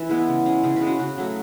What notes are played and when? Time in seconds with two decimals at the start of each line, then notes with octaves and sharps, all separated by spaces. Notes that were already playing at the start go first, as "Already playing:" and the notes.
Already playing: E3 E5
0.09 G#3 B3 E4
0.28 C#3
0.46 G#3 C#4
0.63 C#3 G#4
0.76 G#3 B4
0.87 C#4 F#4
0.99 C#3 F#4
1.18 F#3 A3